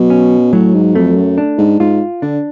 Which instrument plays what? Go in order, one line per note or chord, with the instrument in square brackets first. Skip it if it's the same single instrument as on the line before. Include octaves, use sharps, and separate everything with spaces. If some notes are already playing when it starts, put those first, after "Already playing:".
Already playing: [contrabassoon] B2 [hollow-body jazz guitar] F#3
[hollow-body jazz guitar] C#4
[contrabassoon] A2 [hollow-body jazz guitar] F#3
[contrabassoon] G#2
[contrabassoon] F2 [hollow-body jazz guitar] A3
[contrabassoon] F#2
[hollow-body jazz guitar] D4
[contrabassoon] G#2
[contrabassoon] G#2 [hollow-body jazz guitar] F4
[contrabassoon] D3 [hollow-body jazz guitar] D4